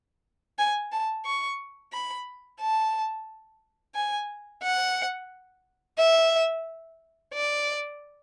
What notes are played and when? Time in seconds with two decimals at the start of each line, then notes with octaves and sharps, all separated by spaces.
0.59 G#5
0.92 A5
1.26 C#6
1.93 B5
2.61 A5
3.95 G#5
4.63 F#5
5.98 E5
7.34 D5